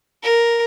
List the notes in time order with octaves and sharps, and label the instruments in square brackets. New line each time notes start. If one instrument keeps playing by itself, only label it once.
[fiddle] A#4